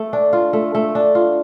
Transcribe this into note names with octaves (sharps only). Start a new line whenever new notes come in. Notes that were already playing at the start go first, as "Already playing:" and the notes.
Already playing: A3
D4
F4
A3
A3
D4
F4